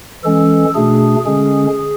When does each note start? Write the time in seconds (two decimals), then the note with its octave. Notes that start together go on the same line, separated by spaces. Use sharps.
0.24 E3 G#3 C#4 A4
0.74 B2 A3 D4 G#4
1.26 D3 G#3 C#4 G#4